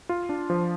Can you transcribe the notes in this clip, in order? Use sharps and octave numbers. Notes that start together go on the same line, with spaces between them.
F4
D4
F3